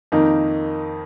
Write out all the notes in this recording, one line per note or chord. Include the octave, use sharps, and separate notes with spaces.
F2 D#3 A#3 D#4